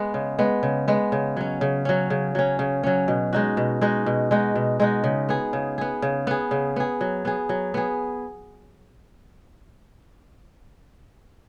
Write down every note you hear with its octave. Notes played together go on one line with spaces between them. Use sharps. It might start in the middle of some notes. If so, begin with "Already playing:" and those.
Already playing: G#3 B3
C#3
G#3 B3
C#3
G#3 B3
C#3
F#3 C#4
C#3
F#3 C#4
C#3
F#3 C#4
C#3
F#3 C#4
B2
G#3 D#4 F#4
B2
G#3 D#4 F#4
B2
G#3 D#4 F#4
B2
G#3 D#4 F#4
C#3
B3 G#4
C#3
B3 G#4
C#3
B3 G#4
C#3
B3 G#4
F#3
B3 G#4
F#3
B3 G#4